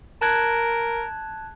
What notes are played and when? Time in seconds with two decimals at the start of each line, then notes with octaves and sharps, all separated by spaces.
0.21 A#4 A5 F#6 G#6